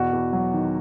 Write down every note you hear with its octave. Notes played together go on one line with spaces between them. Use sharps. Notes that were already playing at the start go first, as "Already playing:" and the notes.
Already playing: E2 B2 F#4
E2
F#3
D#3